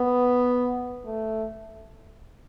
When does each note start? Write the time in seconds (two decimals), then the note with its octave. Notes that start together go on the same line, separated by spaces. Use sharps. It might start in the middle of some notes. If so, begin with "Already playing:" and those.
Already playing: B3
1.05 A3